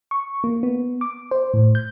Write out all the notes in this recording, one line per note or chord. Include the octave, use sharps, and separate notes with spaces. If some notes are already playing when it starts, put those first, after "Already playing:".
C#6
A#3
B3
D6
C5
A2
G6